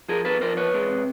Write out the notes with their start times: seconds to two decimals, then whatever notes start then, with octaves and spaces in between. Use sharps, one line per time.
0.09 F3 G#4 A#4
0.25 B3 A4 B4
0.41 F3 A#4 C5
0.57 E2 B4 C#5
0.74 G#3
0.90 C3